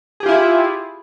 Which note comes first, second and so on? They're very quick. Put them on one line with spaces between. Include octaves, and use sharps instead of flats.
G#4 G4 F4 E4